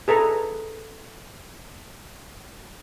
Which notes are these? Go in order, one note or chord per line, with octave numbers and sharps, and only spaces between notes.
G#4 A4 B4 A#5